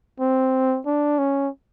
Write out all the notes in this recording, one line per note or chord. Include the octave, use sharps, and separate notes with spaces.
C4
D4
C#4